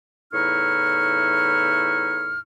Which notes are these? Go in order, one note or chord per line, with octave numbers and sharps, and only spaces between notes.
E2 A2 D#4 E4 C#6 F6